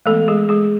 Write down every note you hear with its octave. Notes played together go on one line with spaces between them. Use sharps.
E3 G#3 A3 B3 A4
G#3 G#4
G#3 G#4